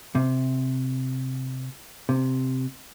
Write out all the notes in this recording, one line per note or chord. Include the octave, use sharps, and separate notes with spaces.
C3
C3